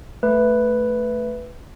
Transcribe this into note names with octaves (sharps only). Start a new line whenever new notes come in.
A3 B4